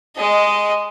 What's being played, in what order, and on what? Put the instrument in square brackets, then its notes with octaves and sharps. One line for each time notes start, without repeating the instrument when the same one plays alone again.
[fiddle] G#3 D#5